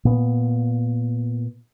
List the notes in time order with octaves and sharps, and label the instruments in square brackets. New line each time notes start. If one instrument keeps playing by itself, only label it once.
[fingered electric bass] A#2 B3